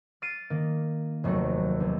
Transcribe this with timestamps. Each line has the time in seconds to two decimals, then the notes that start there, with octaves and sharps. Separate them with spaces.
0.22 F6 A6 C7 D7 D#7
0.50 D#3 A#3
1.24 F1 D#2 F#3 A3 F#4
1.80 B1